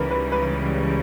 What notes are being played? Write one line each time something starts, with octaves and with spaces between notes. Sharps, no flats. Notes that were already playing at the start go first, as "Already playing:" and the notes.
Already playing: C#2 C#3 E3 G3 A#4 B4
B4
B4